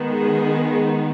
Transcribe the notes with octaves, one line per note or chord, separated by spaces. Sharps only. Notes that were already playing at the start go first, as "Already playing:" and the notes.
Already playing: D#3 G#3 B3
G#4